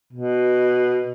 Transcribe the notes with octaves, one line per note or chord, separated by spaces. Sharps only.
B2